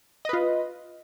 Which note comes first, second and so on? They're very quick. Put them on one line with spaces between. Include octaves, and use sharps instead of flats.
D#5 B4 F4